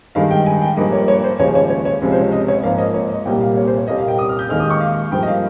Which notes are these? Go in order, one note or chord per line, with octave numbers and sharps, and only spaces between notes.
G2 D#3 G#3 F5
G5
G#5
G5
G2 F3 A#3 D#5
C#5
C#5
C5
D#2 C#3 F3 G#3 C#5
C#5
C#5
C#5
C#2 C3 F3 G#3
C5
C#5
D#5
C#5
G#2 F3 A#3 F5
D#5
C#5
D#5
C2 A#2 G3 A#3 G5
F5
C#5
C5
C#5
C2 A#2 G3 A#3 D#5
F5
G5
D#6
F6
G6
D#2 D#3 G#3 F6
D#6
C#6
F5
G2 F3 A#3 G5
D#5
F5